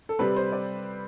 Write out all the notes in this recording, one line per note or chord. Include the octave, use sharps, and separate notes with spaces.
A4
C3 G3 C4 B4
C5
D5